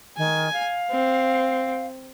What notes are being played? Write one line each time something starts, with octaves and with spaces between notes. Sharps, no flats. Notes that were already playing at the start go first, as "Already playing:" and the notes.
D#3 G#5
F5
C4